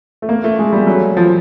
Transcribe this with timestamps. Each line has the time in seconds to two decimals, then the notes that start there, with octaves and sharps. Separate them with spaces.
0.22 A3
0.29 A#3
0.44 A3
0.59 G#3
0.73 G3
0.87 F#3
1.17 F3